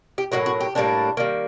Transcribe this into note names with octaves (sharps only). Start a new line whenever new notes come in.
G4
A2 F#3 A#3 F#4
F#4
G4
A2 G3 A#3 D4
D#3 G3 A#3